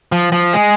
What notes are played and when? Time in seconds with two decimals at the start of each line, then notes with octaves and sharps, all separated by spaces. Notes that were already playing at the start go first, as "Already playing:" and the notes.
0.12 F3
0.32 F3
0.53 G#3